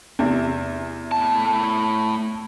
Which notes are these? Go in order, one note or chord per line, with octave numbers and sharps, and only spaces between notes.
E2 C3
A2 A5